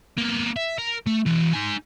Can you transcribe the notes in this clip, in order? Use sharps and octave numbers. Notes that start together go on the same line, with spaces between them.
A#3 B3
E5
A#4
A3
E3 F#4
D#4 G#5